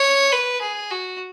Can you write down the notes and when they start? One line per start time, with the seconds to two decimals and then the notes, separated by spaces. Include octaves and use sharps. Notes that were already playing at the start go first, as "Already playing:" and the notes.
Already playing: C#5
0.32 B4
0.62 G#4
0.91 F#4